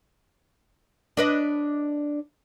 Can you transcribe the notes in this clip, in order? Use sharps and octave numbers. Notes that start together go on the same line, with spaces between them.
D4 B4 D#5